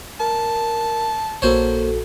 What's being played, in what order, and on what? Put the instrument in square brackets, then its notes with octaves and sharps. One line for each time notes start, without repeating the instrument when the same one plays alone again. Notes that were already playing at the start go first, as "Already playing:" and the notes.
[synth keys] A#4 [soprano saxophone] A5
[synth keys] A#1 F#4 A4 [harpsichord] A#3 C5 C#5